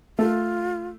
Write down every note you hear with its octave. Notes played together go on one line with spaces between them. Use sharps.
A3 F4